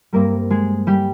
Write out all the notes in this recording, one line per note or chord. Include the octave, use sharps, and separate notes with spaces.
G2 G3 A#3 C4 A#4
G#3 G#4
G3 G4